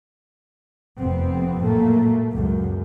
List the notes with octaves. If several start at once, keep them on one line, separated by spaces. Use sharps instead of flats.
F1 F2 B3 C4
A#2 F#3 A3 A#3
C#2 F#2